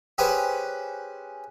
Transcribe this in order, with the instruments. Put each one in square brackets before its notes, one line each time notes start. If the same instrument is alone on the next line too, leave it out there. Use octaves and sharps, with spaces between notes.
[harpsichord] C#4 G4 G#4 B4 C5 F#5